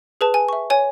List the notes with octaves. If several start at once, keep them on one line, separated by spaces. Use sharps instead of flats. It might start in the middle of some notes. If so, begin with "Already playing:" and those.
G#4 B4 A5
G#5
E5 C#6
C#5 G#5